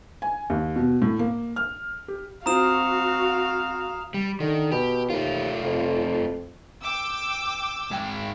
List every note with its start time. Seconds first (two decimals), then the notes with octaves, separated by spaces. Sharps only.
0.22 G#5
0.50 D#2
0.76 B2
1.02 A2
1.19 A#3
1.56 F6
2.08 G4
2.46 C4 F4 F#4 F5 A#5 D#6 E7
4.14 G3
4.40 D3 D#3
4.72 B2 G4
5.10 D#2 A3 F4
5.65 F2
6.82 G5 D6 E6
7.91 G#2 G5